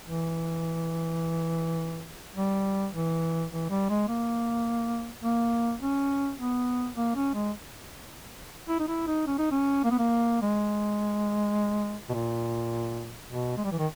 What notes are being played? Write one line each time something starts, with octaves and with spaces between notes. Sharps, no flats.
E3
G3
E3
E3
G3
G#3
A#3
A#3
C#4
B3
A#3
C#4
G#3
E4
D#4
E4
D#4
C#4
D#4
C#4
A#3
B3
A#3
G#3
B2
A#2
B2
G#3
G3
E3
D#3